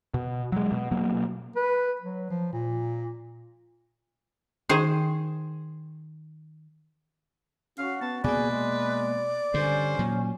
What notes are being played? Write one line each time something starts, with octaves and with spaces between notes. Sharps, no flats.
B2
F#3 G#3
B2
B2 F#3 A#3
B4
F#3
F3
A#2
D#3 G#4 C5
C#4 F#4 F5
B3 A5
B2 A#3 G#4 B4 D5
G#3
G2 D3 C#4 C5
A#2 F#3